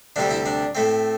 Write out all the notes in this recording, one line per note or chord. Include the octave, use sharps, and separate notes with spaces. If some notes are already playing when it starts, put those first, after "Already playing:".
D2 C3 G3 C4 D4
E4
D4
A2 A3 C4